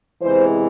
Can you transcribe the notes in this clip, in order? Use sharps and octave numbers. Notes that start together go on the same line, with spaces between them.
E2 C3 E3 G#3 C5